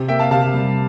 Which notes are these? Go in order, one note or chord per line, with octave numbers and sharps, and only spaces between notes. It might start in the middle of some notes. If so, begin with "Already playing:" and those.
Already playing: C3
A#3 E5 G5
F5 A5
C3 F5 A5
G3